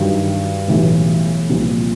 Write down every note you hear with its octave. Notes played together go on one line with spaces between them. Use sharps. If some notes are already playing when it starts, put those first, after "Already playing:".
Already playing: G2 D#3 F#3
B1 A2 E3 G3
C2 A#2 F3